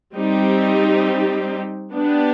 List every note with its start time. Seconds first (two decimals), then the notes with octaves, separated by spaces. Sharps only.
0.15 G3 C4 D#4 G4
1.93 B3 D4 G4